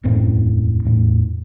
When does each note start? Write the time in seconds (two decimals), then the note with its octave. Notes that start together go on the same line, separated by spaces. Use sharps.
0.03 E1 F#2 A2 C4
0.85 E2 A2